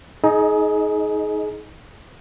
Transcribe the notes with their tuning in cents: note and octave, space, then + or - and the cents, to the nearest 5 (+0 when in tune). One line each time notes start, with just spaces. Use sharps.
D#4 +20 G#4 +30 D#5 -10